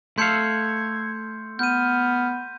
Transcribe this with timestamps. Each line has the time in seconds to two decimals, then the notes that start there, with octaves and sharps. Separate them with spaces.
0.18 A3 A4 F5 C6 G6 G#6 C#7
1.59 B3 F6 G6 D#7